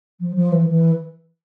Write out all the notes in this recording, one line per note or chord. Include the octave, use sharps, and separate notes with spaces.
F3
F3
E3
E3